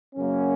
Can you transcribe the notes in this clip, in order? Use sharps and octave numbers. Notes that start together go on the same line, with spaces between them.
F#2 C#3 F#3 A#3 C#4